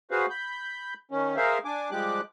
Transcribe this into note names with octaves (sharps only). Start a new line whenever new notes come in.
F#4 G#4 B4 C5 F5
B5 G6
D#3 C#4
G#4 A#4 C5 E5 F5
D4 G#5 D6
F3 G3 G#3 G4 D6 F#6